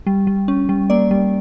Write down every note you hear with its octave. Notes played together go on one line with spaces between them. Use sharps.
G3
G3
C#4
G3
A#3 D5
G3